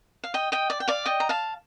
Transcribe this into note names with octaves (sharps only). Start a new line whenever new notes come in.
F5
D#5 G5
D#5 G5
D5
G5
D5 F5
D#5 G5
A#5
F5 A5